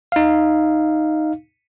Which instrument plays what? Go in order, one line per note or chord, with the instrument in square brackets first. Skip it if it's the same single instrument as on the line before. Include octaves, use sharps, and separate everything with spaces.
[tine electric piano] D#4 F5